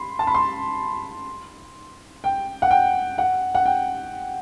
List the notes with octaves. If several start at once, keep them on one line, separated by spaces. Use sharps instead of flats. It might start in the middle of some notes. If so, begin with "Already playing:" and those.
Already playing: B5 C6
A5
B5
C6
G5
F#5
G5
F#5
F#5
G5